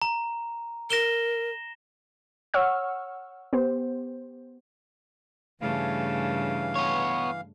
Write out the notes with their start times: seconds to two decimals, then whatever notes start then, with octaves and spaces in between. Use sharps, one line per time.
0.02 A#5
0.90 A#4 A#6 E7 G7
2.54 C#5 F#5 C#6 E6 F6
3.53 B3 G4 C5
5.61 G2 C#3 E3 A3 F5
6.76 B3 C#5